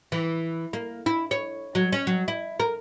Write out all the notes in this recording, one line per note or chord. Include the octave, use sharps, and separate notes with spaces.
E3
A#3
E4
C#5
F#3
C#4
F#3
E4
A#4